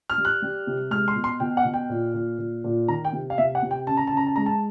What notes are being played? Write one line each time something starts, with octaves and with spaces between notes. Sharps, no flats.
F6
G3
F#6
G3
C3
G#3 F6
C6
B2
C6
B2 G5
F#5
B2
G5
A#2
A#2
A#2
A#2
D#3 A#5
G5
C3
F5
C3 E5
F#5
C3
G5
C#3 A5
A#5
C#3 A5
A#5
A5
G#3 A#5
A5